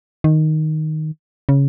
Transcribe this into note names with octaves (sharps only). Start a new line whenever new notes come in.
D#3
C#3